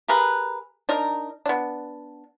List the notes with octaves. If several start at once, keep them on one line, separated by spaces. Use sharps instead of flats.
G4 G#4 A#4 B4
D4 D#4 A#4
B3 D4